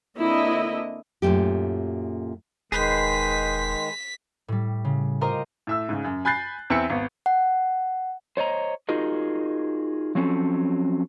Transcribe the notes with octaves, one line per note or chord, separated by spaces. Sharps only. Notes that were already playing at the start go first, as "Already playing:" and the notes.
D3 A#3 C4 D4 E4 D#5
F#2 A#2 C#3 A3 G4
E1 D#3 G#3 G#4 B4 C5 B6
A2 G3
C#3
F4 G4 A#4 C5 D#5 A#5
A2 E5 E6
G#2 C#3
F#2
G#5 B5 F#6 G6 A6 C7
E2 C4 B4 E5 E6 C#7
G#1 B3
F#5
C5 C#5 D#5 A#5
D#4 F4 F#4 G#4 A#4 D#5
F3 F#3 C4 C#4 A4